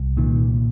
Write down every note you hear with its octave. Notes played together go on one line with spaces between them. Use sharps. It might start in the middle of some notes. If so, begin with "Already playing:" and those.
Already playing: C2
A#2 D#3